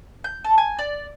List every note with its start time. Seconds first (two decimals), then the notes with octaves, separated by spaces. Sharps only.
0.24 G6
0.44 A4
0.58 G#5
0.79 D5